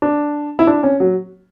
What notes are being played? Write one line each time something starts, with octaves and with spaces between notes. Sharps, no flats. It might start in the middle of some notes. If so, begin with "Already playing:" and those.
D4
E4
D4
C#4
F#3